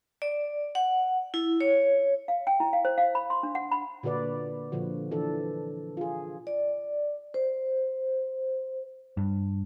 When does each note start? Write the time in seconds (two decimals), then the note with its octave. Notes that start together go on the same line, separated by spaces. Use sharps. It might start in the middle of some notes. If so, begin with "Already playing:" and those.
0.22 D5
0.75 F#5
1.34 E4
1.60 C#5
2.28 F5
2.47 G5
2.60 E4
2.73 F5
2.85 C5
2.98 F5
3.15 B5
3.30 C6
3.43 D4
3.55 F#5
3.71 B5
4.03 A#2 D3 F#4 B4 D5
4.72 A#2 D3 F3 F#4
5.11 E3 D4 A4
5.97 F4 G#4
6.47 D5
7.34 C5
9.17 G2